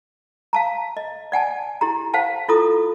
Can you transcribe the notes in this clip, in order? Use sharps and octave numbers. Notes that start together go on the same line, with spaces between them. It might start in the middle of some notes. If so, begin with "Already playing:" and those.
F5 A5 A#5
D#5
D5 F#5 G#5 A5
E4 G4 A#5
C5 F5 F#5 A5
E4 F4 A4 A#5 D#6